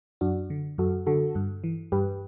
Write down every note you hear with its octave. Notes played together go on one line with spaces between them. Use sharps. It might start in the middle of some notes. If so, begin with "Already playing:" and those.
F#2 D4 F#4
D3
F#2 F#4 A4
D3 F#4 A4
G2
E3
G2 G4 B4